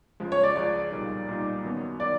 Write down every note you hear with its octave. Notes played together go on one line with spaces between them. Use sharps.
C#2 C#3 F3 G#3
C#5
D5
C#2 C#3 F3 G#3 D5
B1 A#2 G3 A#3 D#4
B1 A#2 G3 A#3 D#4
F#2 D#3 F#3 B3
D#3 F#3 B3 D5